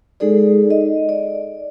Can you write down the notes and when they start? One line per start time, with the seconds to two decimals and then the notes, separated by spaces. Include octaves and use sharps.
0.20 G#3 D#4 G#4 A4 D5
0.71 D#5
1.09 D5